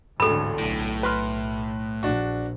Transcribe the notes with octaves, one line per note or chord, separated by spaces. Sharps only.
A1 D2 G#2 D3 A4 B5
B1 A2
B4 C6 F6
A#1 D4 F#4